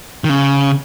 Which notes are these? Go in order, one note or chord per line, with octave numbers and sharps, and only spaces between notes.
D#3
C#3